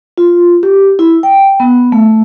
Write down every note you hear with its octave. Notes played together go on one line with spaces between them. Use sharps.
F4
G4
E4
G5
B3
A3